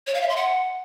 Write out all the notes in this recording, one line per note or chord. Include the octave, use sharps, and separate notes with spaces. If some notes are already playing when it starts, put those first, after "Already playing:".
C#5
F5
E5
C6
F#5